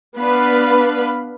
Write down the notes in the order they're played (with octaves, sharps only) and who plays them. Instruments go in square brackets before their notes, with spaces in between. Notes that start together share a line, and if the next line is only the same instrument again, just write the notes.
[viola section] B3 D4 B4 F5 B5